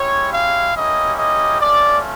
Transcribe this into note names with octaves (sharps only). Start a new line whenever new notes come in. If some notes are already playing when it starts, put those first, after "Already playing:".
Already playing: G#3 C#4 E4 G4 C#5
F5
A#3 C#4 E4 G4 D#5
D#5
A3 C#4 F4 D5